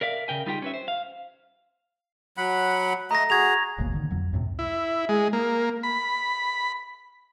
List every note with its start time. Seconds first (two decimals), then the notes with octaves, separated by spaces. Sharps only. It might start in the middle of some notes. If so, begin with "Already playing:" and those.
0.01 A#4 D5 E5 F5
0.28 C#3 A#4 G5 G#5
0.46 G3 D#4 F4 G4 G#4 G5
0.62 C#4 B4 E5
0.74 C5
0.88 F5
2.37 F#3 F#5 B5
3.11 A3 D#5 A#5 A#6
3.30 F#4 G#4 G#6 F7
3.78 D#1 G#1 B2 A#3
3.93 D3 D#3
4.11 F2 F#3
4.32 C#2 F#2 A2 C3
4.59 E4
5.09 G#3
5.33 A#3
5.83 B5